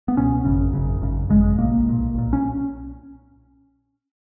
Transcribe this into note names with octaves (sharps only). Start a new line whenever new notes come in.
B3
C#2 B2 C#4
G#1 F#2 C#3
G#1 F#2 C#3
G#1 F#2 C#3
G#1 F#2 C#3 G#3
G#3
B1 A#2 A#3
B1 A#2
B1 A#2
C#4